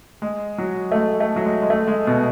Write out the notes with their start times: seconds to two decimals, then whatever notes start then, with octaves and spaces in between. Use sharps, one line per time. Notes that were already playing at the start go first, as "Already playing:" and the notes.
0.22 G#3
0.58 F#3
0.92 A3
0.95 G#3
1.20 A3
1.36 F#3
1.45 G#3
1.62 G#3
1.70 A3
1.88 G#3
2.07 B2